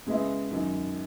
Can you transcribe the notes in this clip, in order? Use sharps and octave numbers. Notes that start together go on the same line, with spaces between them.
C#3 G#3 B3 E4
F#2 D#3 F#3